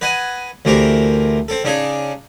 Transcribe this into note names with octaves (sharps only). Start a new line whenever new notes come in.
B4 D#5 F#5 G#5
D2 E3 C4 G4 A#4
C4 A4
C#3 D4 D#4 G#4